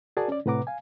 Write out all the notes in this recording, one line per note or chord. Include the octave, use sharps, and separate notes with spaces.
F#4 G#4 A#4 D5 G#5 A5
C#4 D5
A2 C3 B4 F#5 A#5 D6
F5 G#5